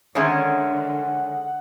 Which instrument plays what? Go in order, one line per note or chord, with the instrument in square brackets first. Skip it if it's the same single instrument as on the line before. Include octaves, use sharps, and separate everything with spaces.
[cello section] D3 [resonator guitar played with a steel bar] D#3 G#3 C#4 [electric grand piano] C#5 E5 C6 [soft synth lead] F#5